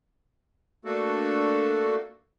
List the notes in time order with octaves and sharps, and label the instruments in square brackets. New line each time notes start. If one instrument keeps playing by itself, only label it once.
[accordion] A3 A#3 D4 F#4 A4